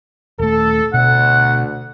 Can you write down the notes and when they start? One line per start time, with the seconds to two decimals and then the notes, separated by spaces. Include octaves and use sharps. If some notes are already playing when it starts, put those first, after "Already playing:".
0.39 D#1 A3 A4
0.94 D2 B2 F#5